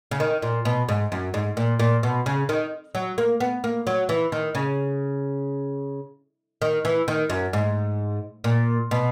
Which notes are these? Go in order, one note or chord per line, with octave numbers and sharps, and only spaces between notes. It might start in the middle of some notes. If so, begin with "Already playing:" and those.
C#3
D#3
A#2
B2
G#2
F#2
G#2
A#2
A#2
B2
C#3
D#3
F#3
A#3
B3
A#3
F#3
E3
D#3
C#3
D#3
E3
D#3
F#2
G#2
A#2
B2